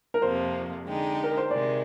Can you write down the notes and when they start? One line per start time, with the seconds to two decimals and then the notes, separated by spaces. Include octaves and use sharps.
0.14 A#4
0.22 F2 C3 F3 A#3 C5
0.86 D3 G#3 D#4 G4
1.24 A#4
1.37 C5
1.50 C3 D#3 G#3 D5